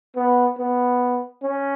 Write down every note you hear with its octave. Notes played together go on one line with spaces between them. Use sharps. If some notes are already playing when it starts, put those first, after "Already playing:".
B3
B3
C#4